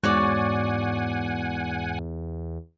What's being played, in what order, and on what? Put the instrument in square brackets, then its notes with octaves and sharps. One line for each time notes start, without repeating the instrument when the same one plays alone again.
[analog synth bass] E2 [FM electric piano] G#2 [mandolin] F#4 C#5 D5 [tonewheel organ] F#5 G#5